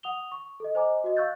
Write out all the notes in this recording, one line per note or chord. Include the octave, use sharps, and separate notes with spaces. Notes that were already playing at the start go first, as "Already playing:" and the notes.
F#5 D#6 F7 G7
C#6
A4 D#5
C5 D#5 G#5 A#5 D6
F#4 D#5
F5 C#6 E6 F#6 G6 A6